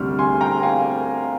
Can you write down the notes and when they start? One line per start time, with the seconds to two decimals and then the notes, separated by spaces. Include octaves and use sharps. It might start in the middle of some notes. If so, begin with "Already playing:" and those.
Already playing: D2 C3 G3 D4 F6
0.19 G#5 C6
0.41 G5 A#5
0.63 F5 G#5